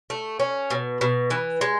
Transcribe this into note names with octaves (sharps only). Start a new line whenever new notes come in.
A3
C#4
B2
B2
E3
G#3